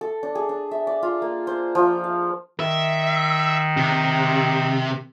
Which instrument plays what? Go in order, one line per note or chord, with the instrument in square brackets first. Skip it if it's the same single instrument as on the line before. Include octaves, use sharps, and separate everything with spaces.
[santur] A4
D4
G#4
D4
E5
D5
F4
A#3
C5
F3
F5
[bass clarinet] D#3 [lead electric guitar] E5
[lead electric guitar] C3